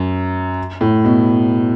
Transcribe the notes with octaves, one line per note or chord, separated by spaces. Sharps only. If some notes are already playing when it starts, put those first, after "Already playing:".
Already playing: F#2
A2
B2